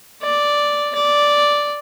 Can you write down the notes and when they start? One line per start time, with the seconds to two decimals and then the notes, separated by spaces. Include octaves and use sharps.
0.23 D5
0.95 D5